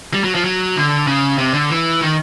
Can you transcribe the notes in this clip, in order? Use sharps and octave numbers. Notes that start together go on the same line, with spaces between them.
G3
F#3
F3
F#3
D3
C#3
C3
D3
E3
D#3